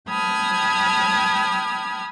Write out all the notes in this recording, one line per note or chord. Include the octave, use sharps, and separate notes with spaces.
G5 A5 B5 D#6 F6 G#6